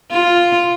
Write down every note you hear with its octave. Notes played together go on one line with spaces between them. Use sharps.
F4